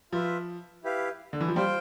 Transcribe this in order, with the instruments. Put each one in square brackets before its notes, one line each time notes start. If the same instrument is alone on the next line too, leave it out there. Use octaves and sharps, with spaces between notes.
[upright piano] F3 [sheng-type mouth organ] F4 B4 E5
[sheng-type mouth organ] E4 G4 B4 F5
[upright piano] D3
E3
F3
[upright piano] G3 [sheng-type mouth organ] F4 C5 G5